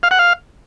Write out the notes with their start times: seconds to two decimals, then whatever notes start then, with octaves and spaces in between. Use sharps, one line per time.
0.03 F5
0.11 F#5
0.19 F5